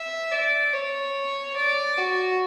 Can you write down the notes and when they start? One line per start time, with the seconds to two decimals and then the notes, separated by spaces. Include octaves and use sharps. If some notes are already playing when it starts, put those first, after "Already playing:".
Already playing: E5
0.31 D5
0.73 C#5
1.56 D5
1.97 F#4